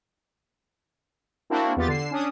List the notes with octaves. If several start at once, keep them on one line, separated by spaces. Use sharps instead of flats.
A#3 C4 D4 E4 F#4
E2 B3 F4 G4 A6
D3 C7 E7
C#4 D4 D#6